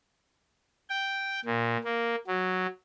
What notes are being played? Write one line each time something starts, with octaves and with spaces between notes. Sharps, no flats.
G5
A#2
A#3
F#3